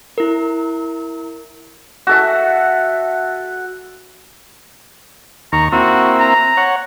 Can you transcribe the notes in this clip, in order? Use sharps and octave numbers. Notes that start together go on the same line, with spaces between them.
E4 A#4
F#4 A4 E5
D#2 A#5 C#6
A#3 C4 E4 F#4
A#5
C#5 F#5